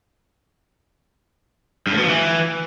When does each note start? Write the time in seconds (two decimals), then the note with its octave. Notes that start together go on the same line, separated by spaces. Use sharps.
1.87 G2
1.92 A2
1.98 B2
2.03 F3
2.09 E3